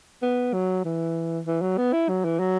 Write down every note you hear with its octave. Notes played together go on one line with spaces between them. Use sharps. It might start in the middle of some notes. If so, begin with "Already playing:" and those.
B3
F#3
E3
E3
F#3
B3
E4
F#3
E3
F#3